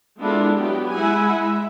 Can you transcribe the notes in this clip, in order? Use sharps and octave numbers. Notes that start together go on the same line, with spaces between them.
G#3 B3 D4 E4 F4 A4
F#3 B3 G4
G#3 E4 E5 F#5 G#5
G#3 E5